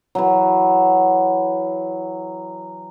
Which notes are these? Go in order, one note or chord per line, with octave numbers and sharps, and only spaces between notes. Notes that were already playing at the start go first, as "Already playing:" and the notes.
E3 F#3